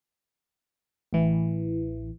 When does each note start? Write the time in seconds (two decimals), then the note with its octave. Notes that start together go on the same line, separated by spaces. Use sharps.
1.13 A1 E3